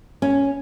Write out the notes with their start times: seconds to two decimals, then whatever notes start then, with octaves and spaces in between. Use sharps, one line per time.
0.22 C#4